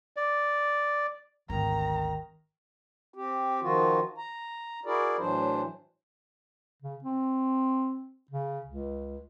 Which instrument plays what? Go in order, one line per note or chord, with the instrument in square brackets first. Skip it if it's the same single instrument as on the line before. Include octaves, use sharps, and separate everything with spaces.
[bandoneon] D5
[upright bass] G#1 D2 [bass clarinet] D#3 [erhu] A#5
[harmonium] C4 G4
D#3 F3 F4 F#4
A#5
E4 F#4 G#4 A#4 D5
A2 E3 F#3 D4 C5
[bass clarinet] C#3
C4
C#3
C#2